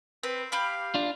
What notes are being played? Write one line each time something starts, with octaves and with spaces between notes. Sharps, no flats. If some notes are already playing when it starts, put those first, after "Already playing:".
C4 B4
G4 F5 B5 D6
D4 F4